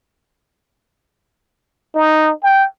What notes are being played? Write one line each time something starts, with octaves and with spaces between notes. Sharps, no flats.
D#4
G5